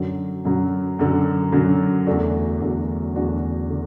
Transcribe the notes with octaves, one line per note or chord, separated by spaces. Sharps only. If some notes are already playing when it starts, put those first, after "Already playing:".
Already playing: F#2 D3 F#3
F#2 D3 F#3
F#2 D3 F#3
F#2 D3 F#3
E2 D3 A3 D4 F#4
E2 D3 A3 D4 F#4
E2 D3 A3 D4 F#4
D3